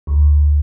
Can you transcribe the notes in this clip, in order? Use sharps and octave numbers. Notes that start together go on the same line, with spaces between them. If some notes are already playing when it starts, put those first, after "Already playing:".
D2